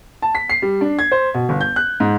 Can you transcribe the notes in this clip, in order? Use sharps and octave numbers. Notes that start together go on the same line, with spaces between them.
A5
B6
C7
G3
D4
G#6
C5
B2
G1
G6
F#6
G#2